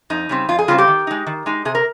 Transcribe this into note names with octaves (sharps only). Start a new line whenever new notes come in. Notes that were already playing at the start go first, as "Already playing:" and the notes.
F2 D#4
C#3 G3 C4
F2 F4
G#4
C#3 G3 C4 F4
G4
D#3
G#3 D#4
D#3
G#3 D#4
C3 G#4
A#4